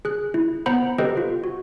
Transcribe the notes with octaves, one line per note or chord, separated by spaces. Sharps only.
G#4 F#6
E4
B3 C5 F#5 A#5 B5
G4 A4 B4 C5 D#5 G5
F4
F#4